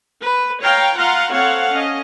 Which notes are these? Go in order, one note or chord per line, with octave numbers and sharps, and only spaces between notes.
B4
C#5 F5 G5 A#5
F4 F5 F#5 A#5 C6
C4 A4 C#5 F5 F#5
C#4 D#5